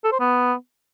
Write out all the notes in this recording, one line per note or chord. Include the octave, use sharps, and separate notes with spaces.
A4
C5
B3